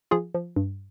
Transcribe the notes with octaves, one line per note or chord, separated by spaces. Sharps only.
F3 F4 G#4
F3
G2